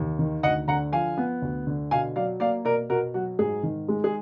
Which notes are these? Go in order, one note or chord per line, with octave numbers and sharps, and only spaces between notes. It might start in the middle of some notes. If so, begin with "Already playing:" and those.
Already playing: D#2
D#3
D2 D#5 F#5
D3 F#5 A#5
F3 F5 G#5
B3
D2
D3
B2 F5 G#5
F#3 D5 F5
A#3 D5 F5
B2 A#4 D5
B2 F#4 A#4
F#3 F#4
G#2 G#4
D#3
G#3
G#4